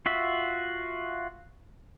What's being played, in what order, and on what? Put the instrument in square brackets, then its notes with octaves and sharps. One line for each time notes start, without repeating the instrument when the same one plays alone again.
[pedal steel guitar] F4 F#4 E5